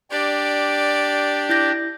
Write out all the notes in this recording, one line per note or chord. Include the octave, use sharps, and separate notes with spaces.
D4 G4 D5
E4 G6 A#6